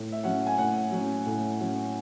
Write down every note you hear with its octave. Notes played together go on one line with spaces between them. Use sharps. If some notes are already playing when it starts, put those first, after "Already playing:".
Already playing: A2
E5
F#3 C#4 F#5
G#5
A2 F#5
F#3 C#4
A2
F#3 C#4